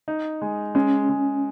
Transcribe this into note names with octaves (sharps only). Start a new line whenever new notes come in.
D#4
G#3
G#3 C#4
G#3